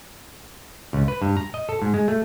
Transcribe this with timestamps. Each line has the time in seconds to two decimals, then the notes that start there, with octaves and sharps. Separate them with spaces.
0.93 C#2
1.08 B4
1.22 G2
1.37 A#5
1.54 D#5
1.69 A4
1.82 G#2
1.94 G#3
2.08 A3